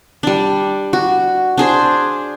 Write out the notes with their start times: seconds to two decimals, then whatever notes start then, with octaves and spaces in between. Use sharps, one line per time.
0.23 G3 D4
0.93 F#4
1.58 D4 G#4 C5